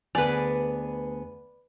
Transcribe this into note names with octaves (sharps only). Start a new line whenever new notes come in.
D2 B3 G#4 B4 D5 G#5